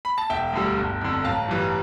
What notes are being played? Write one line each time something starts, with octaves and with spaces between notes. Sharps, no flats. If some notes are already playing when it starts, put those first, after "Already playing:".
B5
A5
E1 E5 G5
D2 D3 G3
G1
F2 D3
A1 F5 A5
G2 E3 G3